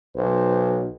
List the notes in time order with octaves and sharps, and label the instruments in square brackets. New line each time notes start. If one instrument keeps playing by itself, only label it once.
[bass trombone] B1 [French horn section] B4 C5